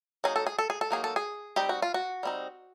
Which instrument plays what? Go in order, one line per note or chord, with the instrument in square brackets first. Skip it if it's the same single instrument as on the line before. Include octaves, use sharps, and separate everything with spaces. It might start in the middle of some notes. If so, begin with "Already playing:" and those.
[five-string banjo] F#3 A#3 D#4 G#4
A4
G#4
A4
G#4
A4
F#3 A#3 D#4 G#4
A4
G#4
G3 C4 D#4 G4
F#4
F4
F#4
G3 C4 D#4